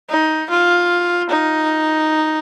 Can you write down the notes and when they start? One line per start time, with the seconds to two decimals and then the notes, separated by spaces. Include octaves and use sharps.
0.10 D#4
0.50 F4
1.30 D#4